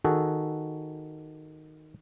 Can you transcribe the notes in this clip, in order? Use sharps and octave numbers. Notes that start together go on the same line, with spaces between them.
D#3 F#4 G#4 A4